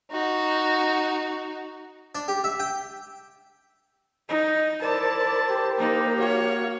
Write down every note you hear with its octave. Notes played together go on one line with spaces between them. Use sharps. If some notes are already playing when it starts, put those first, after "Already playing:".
D#4 F#4
D4
G4
E5
G5
D#4 D#5
E4 A#4 C5 D5 A5
G4
A#3 D#4
F#4 C#5 F5